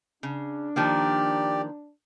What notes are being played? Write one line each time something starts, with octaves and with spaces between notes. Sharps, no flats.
C#3 D4
D#3 F3 A#3 G4 D5